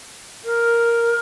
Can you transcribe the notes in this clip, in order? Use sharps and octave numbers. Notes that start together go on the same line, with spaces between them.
A#4